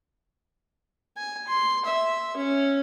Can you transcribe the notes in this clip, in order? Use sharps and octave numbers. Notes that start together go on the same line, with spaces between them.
G#5
C6
E5
C#4